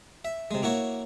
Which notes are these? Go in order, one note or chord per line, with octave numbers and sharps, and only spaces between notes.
E5
C3 G#3
A#3 E4 F#4 C#5